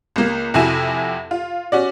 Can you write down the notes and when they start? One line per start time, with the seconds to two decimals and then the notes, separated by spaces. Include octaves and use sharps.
0.16 C#2 A#3
0.54 F2 C3 E4 F#4 G#5 E7
1.31 F4
1.72 C#4 F#4 D5